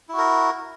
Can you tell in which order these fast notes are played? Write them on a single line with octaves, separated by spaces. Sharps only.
E4 F#4 A#4